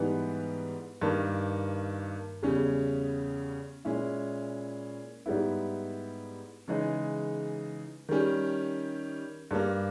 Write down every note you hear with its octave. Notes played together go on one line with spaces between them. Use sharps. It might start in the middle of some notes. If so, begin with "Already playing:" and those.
Already playing: G#2 E3 G3 B3
G2 D#3 A#3
E2 C#3 G3 C#4
A#2 G#3 C#4 E4
G#2 G3 B3 E4
C#3 E3 G#3 D#4
D#3 G3 C#4
G2 G3 A#3